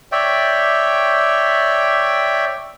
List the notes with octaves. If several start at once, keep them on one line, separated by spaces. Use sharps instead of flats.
C#5 D5 E5 G5